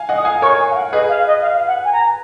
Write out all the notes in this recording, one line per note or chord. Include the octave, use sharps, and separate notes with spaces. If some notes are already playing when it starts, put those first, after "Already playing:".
Already playing: F5 G#5
D#5 F#5
D#6
F5 G#5
A#4 C#5 C#6
G#5
F5
F#5
G#4 B4 D#5
F5
D#5
F5
F5
F#5
G#5
A#5